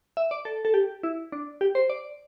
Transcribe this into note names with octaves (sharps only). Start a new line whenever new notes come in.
E5
D5
A4
A4
G4
E4
D4
G4
C5
D5